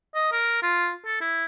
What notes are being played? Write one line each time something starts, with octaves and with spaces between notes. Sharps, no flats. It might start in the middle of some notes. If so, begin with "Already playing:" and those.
D#5
A#4
F4
A4
E4